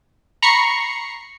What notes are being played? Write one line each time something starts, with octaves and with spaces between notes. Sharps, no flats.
A#5 B5 C#6 C7 C#7